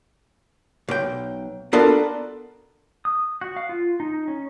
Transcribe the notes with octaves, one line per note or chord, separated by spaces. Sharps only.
B1 G5
B3 D4 F4 F#4 A4 A#4
D#6
F#4
F5
F4
D#4
C#4